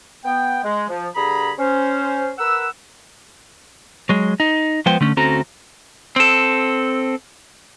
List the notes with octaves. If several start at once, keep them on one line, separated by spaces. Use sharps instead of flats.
B3 G5
G#3
F3
G2 D3 G#4 A#5 B5
C#4 C5
A#4 B4 F#5 E6
F#3 G#3
D#4
F3 G#3 B3 C5 G5
D3 A3 C#4
D2 C4 C#4 F#4 A4 A#5
C4 A4